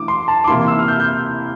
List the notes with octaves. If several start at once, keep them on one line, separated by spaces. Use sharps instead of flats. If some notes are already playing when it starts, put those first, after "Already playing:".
Already playing: E3 A3 D4 D6
C6
A5
D6
C3 E3 A#3 E4 C6
E6
F6
G6
G6